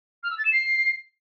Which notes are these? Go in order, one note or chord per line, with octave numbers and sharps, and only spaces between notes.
F6
E6
A6
E7
C7